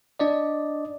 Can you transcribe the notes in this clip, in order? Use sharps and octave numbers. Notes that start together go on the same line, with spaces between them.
D4 D5 D#5